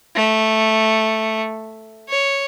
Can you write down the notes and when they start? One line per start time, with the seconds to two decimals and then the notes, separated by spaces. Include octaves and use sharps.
0.16 A3
2.09 C#5